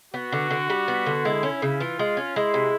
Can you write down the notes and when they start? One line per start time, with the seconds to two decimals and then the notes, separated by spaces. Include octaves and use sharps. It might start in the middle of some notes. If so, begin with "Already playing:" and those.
0.14 B3 F#4
0.32 D3
0.50 D3
0.70 G3
0.88 B3
1.06 D3
1.25 G#3 E4
1.43 C#4
1.62 C#3
1.80 E3 F4
1.99 G#3
2.17 C#4
2.35 G#3 E4
2.54 C3